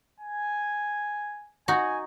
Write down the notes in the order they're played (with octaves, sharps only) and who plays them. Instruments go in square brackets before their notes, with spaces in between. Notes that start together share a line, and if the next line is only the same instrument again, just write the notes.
[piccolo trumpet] G#5
[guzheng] D#4 F#4 [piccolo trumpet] G#5